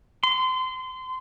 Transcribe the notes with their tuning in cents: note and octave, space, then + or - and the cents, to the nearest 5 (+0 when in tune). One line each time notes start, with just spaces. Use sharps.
C6 -25